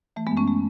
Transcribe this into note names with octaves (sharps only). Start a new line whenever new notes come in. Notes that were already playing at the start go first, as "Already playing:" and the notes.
E3 A3
G#3 B3
F#2
A3 C#4
A3